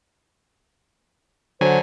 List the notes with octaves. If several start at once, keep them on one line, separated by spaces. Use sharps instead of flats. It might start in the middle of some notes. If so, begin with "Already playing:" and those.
D3 F#3 C5 G#5